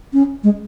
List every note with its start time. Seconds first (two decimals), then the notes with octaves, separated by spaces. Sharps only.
0.13 C#4
0.44 G#3